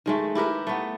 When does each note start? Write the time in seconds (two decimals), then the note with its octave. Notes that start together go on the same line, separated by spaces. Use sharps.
0.06 D#3 G#3 A3
0.35 E4 G4 A#4 B4
0.67 A3 B3